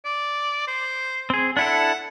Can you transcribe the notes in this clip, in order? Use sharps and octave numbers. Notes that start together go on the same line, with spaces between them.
D5
C5
C4 G#4
D4 E4 A4 F#5